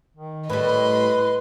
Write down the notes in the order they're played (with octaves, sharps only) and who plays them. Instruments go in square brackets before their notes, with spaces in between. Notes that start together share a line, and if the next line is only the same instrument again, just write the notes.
[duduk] D#3
[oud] A2 G3 [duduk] B4 [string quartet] D#5 C6 [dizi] B5